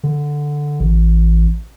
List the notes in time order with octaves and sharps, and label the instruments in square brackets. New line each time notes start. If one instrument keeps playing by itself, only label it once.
[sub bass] D3
A1